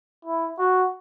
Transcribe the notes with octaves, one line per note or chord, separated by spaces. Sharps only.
E4
F#4